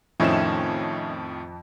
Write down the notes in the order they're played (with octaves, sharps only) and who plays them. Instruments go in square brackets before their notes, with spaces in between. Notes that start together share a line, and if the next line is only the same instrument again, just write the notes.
[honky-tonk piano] F2 E7 [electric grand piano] A2 D#3 F3 [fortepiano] C#4 D#4 E4